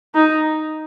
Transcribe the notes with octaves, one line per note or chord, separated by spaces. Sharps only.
D#4